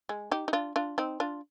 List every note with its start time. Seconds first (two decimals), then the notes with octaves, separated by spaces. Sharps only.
0.09 G#3
0.31 D#4 G4
0.48 D#4
0.53 D4 F4
0.76 D4 F4
0.98 C4 D#4
1.20 D4 F4